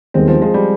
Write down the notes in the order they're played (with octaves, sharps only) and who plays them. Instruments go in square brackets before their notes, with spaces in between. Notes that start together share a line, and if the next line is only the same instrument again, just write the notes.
[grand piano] D#2 D#3 G3 B3 [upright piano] G#3 C4
[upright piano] F3
F3 G#3
G3